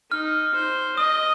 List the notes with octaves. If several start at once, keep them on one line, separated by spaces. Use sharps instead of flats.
D#4 F6
C5
D#5 D#6